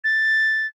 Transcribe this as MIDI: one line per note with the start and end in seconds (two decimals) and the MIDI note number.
0.04 0.67 93